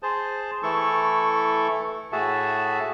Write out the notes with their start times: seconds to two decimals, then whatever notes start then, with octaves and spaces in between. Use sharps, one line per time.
0.03 G#4 C5 A5
0.63 E3 A3 E4 A4 C#6
2.12 A2 F#4 G#4 E5 A5